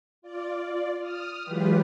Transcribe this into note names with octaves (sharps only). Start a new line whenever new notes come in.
F4 D5
D#6 F6
E3 F#3 G#3 F4 G4 B4